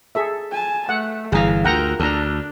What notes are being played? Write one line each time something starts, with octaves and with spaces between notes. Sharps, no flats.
G#4 A4 E5
G#5 A5
A3 F#5
G1 E3 G#4 F5 A#5
D2 F4 A#4 F#5 G5 A#5
D2 D4 A4 A#5